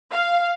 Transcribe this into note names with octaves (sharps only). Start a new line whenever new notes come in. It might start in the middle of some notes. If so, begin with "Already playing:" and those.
F5